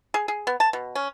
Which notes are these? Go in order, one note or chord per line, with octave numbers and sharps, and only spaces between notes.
G#4
G#4
B3
A5
B2
C#4